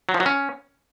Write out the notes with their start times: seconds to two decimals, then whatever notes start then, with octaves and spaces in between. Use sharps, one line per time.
0.09 F#3
0.14 F3
0.20 F#3
0.26 C#4